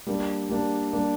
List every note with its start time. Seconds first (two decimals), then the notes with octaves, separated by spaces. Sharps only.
0.07 G3 A#3 D4
0.49 G3 A#3 D4
0.93 G3 A#3 D4